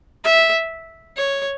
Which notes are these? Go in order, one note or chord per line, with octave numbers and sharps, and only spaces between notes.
E5
C#5